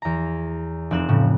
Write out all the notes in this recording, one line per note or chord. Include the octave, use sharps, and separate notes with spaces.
E2 A#5
F1 C4 F#6 E7
A2 C#3